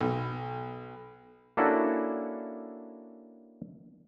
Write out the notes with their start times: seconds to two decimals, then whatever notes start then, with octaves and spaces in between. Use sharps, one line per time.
0.01 B1
1.57 A#3 C#4 D4 E4 F#4 A4